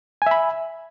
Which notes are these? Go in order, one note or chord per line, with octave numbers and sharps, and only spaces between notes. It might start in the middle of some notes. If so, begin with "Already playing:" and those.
E5 G#5 B5